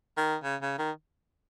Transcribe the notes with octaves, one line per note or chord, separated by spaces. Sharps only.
D#3
C#3
C#3
D#3